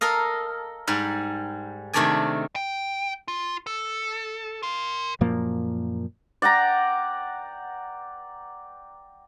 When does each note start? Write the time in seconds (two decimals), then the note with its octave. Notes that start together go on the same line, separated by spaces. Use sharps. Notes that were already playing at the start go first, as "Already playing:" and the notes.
0.01 A4 A#4 D#5 F5
0.87 G#2 G3
1.93 C3 D#3 A3 D4 D5 G#5
2.56 G5
3.28 F4
3.67 A4
4.63 A#4 C6
5.21 F#2 A#2 F3 A#3
6.42 D5 F#5 G5 A#5